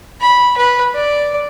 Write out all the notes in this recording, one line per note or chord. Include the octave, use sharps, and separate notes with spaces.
B5
B4
D5